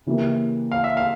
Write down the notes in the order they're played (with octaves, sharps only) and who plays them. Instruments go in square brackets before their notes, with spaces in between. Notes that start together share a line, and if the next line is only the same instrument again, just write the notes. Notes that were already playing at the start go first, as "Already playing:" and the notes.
[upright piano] C#3 E3 A#3 E4 G4
[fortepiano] F5
E5
F5